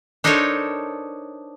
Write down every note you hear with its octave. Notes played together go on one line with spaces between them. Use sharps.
D4 D#4 A4 A#4 C5 C#5